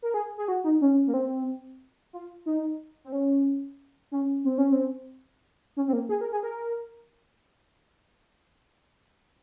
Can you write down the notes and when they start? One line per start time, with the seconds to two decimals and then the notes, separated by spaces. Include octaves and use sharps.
0.02 A#4
0.14 G#4
0.38 G#4
0.48 F#4
0.64 D#4
0.81 C#4
1.07 A#3
1.14 C4
2.13 F4
2.46 D#4
3.04 C4
3.12 C#4
4.11 C#4
4.44 C4
4.58 C#4
4.72 C4
5.77 C#4
5.88 C4
5.93 A#3
6.09 G#4
6.21 A#4
6.32 G#4
6.43 A#4